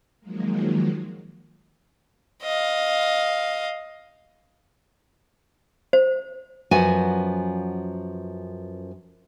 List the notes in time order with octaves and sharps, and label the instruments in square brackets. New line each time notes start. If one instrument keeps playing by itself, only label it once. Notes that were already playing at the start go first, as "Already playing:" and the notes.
[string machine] D#3 F3 F#3 G#3 A#3
[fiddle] D#5 F5
[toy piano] C5
[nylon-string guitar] F#2 F3 B3 F#4 G#5